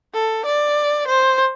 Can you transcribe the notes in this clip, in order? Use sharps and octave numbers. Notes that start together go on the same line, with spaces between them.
A4
D5
C5